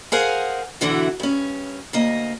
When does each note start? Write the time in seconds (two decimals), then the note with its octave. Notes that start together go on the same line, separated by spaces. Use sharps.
0.12 G#4 A#4 C5 F5 F#5 G#5
0.81 B2 D3 E3 E4 F#4
1.20 G2 C#4
1.93 D2 A#3 D#5